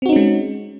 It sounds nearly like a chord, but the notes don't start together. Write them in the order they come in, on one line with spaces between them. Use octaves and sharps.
C4 F#4 D#4 C#4 G#3